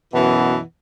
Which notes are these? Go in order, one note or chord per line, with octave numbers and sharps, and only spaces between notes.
F#2 B2 E3